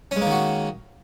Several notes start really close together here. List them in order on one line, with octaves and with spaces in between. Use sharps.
C#4 G#3 A#3 D#3 F#4